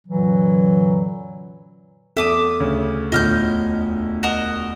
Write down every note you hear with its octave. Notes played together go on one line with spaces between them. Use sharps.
F#2 A#2 D3 E3 F#3
E2 A4 E5 D6 D#6
D2 C#3
E1 D2 A2 D3 F4 D#5 F6 G6
F#4 A#4 D#5